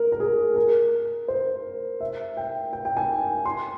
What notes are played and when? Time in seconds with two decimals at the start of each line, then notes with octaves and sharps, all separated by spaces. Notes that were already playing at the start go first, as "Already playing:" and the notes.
Already playing: A#4
0.12 A#4
0.20 G#4
0.56 A#4
1.28 C5
2.00 E5
2.37 G5
2.73 G5
2.85 G5
2.97 G#5
3.46 C6